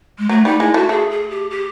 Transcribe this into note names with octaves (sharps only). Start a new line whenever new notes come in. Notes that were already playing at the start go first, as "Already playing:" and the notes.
G#3
F#3 A3
G3 D#4
G#3 E4
A3 F#4
A3 G#4
G#4
G4
G4